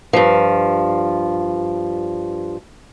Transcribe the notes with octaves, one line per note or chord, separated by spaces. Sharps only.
G2 F3